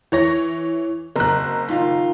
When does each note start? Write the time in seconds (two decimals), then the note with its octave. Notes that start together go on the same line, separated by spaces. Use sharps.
0.12 E3 C#5 A#6
1.16 F#1 C3 A#5 F#6
1.69 D#3 F4